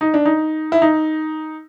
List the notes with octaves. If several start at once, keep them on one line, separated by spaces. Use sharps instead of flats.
D#4
D4
D#4
E4
D#4